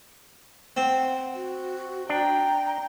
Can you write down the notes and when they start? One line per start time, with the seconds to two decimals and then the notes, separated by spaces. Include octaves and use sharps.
0.77 C4 F#5
1.35 F#4
2.09 D4 G5 A#5